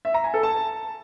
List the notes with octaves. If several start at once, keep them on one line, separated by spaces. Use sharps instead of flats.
E5
A#5
G#5
A4
A5